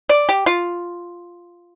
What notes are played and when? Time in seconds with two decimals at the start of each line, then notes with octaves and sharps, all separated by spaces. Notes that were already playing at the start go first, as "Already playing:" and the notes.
0.09 D5
0.29 G4
0.46 F4